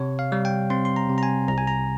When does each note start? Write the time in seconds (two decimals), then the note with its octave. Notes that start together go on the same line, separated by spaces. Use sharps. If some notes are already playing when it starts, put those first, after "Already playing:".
Already playing: C3 C#5
0.19 F5
0.32 G3
0.45 G5
0.70 C4 C6
0.85 C6
0.96 A#5
1.09 C3
1.18 A#5
1.23 G#5
1.48 C2 A#5
1.58 G#5
1.67 A#5